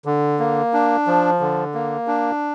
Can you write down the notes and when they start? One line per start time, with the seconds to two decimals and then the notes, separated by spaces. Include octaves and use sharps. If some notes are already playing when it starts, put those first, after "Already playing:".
0.05 D3
0.40 A#3
0.74 D4
1.07 F3
1.40 D3
1.74 A#3
2.07 D4